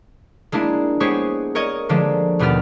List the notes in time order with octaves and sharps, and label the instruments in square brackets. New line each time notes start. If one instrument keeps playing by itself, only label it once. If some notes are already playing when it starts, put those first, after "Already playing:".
[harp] G#3 A#3 D4 E4
G#3 B3 G4 G#4 C5 C#5
A#4 C#5 D#5
D3 F3 G#3 A#3 G4
D#2 B2 B3 G4 F6 A6